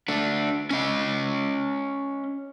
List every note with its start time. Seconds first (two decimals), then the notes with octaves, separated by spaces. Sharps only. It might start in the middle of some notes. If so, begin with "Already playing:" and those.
0.08 A3 D4
0.71 C#4 D#5